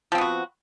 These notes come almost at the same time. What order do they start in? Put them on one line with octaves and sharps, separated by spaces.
F3 C4 B3 F#4